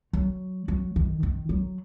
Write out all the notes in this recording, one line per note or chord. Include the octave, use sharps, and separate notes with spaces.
F#3
F#3
D#3
D#3
F#3